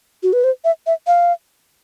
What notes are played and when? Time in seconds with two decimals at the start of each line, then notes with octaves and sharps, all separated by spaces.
0.23 F#4
0.33 B4
0.44 C5
0.64 E5
0.87 E5
1.07 F5